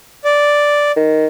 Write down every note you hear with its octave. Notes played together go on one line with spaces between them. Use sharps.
D5
D#3